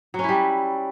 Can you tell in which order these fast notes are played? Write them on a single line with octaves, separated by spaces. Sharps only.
F#3 C#4 E4 G3